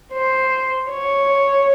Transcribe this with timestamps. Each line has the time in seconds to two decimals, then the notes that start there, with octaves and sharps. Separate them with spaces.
0.13 C5
0.90 C#5